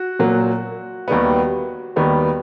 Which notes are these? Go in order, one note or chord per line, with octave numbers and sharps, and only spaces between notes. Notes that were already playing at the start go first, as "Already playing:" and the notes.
Already playing: F#4
A#2 F#3 A#3
D#2 D#3 G3 B3
D#2 D#3 G3 B3